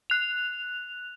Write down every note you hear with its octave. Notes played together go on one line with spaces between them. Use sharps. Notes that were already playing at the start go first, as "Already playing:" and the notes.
F#6 F7